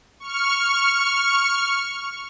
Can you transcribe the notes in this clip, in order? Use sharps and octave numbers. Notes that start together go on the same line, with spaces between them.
C#6 F6